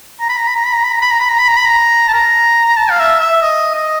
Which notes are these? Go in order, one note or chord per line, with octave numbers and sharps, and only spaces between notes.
A#5
B5
A#5
B5
A#5
B5
A#5
B5
A#5
B5
A#5
B5
A#5
B5
A#5
B5
A#5
A5
A#5
A5
F5
E5
E5
D#5
D#5